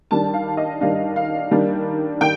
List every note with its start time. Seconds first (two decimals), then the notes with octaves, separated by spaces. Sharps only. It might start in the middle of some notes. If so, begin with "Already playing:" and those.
0.11 D#3 G3 D4 A5
0.34 F5
0.57 D#5
0.81 D#3 G3 D4 F5
1.16 F5
1.51 D#3 G3 A#3 D4
2.21 D#3 G5